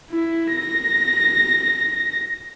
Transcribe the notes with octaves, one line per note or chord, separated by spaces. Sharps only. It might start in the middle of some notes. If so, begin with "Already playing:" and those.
E4
A#6